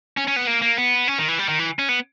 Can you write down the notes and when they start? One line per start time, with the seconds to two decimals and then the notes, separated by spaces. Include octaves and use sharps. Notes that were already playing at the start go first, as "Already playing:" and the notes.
0.17 C#4
0.27 C#4
0.36 B3
0.47 A#3
0.62 A#3
0.78 B3
1.08 C#4
1.19 D#3
1.28 E3
1.39 G3
1.49 D#3
1.59 E3
1.79 C#4
1.89 B3